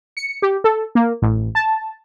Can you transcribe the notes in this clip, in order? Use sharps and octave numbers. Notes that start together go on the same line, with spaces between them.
C#7
G4
A4
A#3
A1
A5